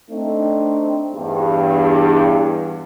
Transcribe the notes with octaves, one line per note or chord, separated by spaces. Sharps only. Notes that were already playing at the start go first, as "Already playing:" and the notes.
A3 C4 D4 D#4
E2 G2